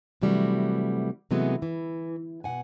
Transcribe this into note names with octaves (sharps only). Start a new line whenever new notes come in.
C3 E3 F#3 G3 A3 F#4
C3 E3 F#3 G#3 A3 B3
E3
B2 F#5 G#5